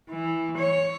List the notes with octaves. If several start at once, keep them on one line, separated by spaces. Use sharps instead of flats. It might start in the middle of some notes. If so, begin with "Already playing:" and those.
E3
C#5